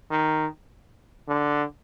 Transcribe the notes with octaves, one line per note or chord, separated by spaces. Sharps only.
D#3
D3